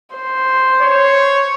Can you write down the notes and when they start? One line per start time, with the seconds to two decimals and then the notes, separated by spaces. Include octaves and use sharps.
0.15 C5
0.82 C#5